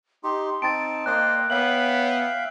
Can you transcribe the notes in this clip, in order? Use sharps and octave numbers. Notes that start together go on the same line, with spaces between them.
D#4 G4 C6
C4 D#4 G5 A5 A6 D7
A#3 C5 D5 D#5 F#6
B3 C#5 E5 F5 G5 F#7
B6